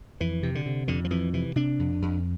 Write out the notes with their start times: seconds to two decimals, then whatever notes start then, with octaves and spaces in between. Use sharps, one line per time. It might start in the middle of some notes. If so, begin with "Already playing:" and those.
0.20 F2 E3
0.43 C3
0.55 D3
0.66 C3
0.88 F2 D3
1.05 F3
1.10 F2 E3
1.33 C3 E3
1.56 C3 D4
1.79 F2
2.02 F2